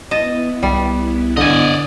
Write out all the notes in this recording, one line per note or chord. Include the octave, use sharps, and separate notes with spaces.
B3 E4 D#5 A5
C2 G3
D3 D5 D#5 G#5